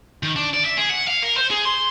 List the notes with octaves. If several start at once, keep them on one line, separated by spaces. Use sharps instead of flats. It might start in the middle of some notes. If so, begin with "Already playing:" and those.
D#3
D4
D5
E5
G#4
F#5
F5
A#4
C5
G#4
C6